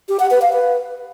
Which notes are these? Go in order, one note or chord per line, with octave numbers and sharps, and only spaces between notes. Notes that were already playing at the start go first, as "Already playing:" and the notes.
G4
F#5
B4
F5
B4